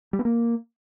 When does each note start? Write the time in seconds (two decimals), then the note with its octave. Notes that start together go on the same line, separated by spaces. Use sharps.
0.13 G3
0.19 B3
0.25 A#3